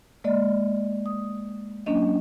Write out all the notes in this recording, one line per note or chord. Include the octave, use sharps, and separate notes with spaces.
G#3 A#3 D5 D#5
D#6
F#3 A#3 C#4 D4 D#5